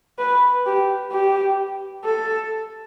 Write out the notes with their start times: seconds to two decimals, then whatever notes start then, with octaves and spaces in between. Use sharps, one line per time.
0.19 B4
0.66 G4
1.12 G4
2.04 A4